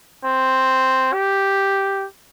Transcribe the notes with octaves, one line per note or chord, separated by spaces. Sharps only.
C4
G4